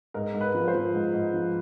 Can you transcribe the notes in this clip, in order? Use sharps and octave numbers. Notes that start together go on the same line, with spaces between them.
G#2 A#4
G#2
B4
F3
C5
F3
G#2
G#2
F3